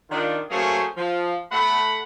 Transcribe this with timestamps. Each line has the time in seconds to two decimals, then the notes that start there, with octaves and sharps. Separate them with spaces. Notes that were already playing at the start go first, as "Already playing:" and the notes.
0.10 D#3 D4 F4
0.50 F#3 A3 A#3 C#4 G#4 C5
0.97 F3
1.52 A3 F#5 B5